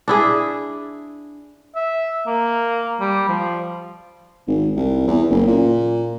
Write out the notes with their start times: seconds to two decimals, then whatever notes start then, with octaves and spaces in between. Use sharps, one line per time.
0.08 D4 E4 G#4
1.76 E5
2.27 A#3
3.00 G3
3.29 F3
4.47 G#1
4.76 C2
5.07 E2
5.29 F#1
5.47 A#2